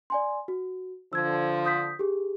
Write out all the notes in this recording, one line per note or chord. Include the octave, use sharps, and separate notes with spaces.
D5 G#5 C6
F#4
D3 F3 E6 G#6
D#6 G6 B6
G4 G#4